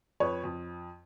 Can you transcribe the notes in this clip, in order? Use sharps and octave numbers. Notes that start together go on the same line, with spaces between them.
F2 B4 C#5
F2